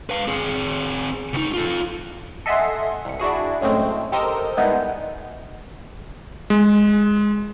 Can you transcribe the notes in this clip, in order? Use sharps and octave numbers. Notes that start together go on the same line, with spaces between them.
B4 F5
C4 G#4
C#2 D#4
F4 A4
A4 D#5 E5 F#5 G#5 C6
C2 C#7
D4 E4 F#4 G#4
F#2 A2 G#3 A3 C4
G4 A4 A#4 C5 D#5 E6
D#3 G3 G#3 B3 D#4 E4
G#3